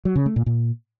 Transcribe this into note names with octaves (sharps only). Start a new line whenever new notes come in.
F#3
C#3
A3
A#2
A#2